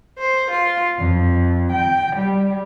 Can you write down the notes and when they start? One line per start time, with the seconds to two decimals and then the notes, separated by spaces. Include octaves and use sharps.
0.19 C5
0.50 F4
0.99 F2
1.72 G5
2.16 G3